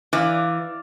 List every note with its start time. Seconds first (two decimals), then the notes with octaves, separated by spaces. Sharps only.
0.13 E3 D5 F5